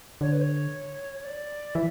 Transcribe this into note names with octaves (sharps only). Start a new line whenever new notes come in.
D3 C#5
B4
C#5
C#5
D5
E3 E5